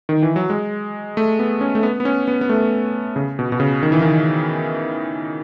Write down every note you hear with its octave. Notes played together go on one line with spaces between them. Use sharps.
D#3
E3
F#3
G#3
A3
B3
C#4
A3
B3
B3
C#4
B3
B3
A3
C#3
B2
B2
C#3
D#3
E3
D#3